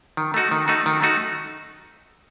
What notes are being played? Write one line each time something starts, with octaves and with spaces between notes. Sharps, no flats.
D#3
A3 D#4 F#4
D#3
A3 D#4 F#4
D#3
A3 D#4 F#4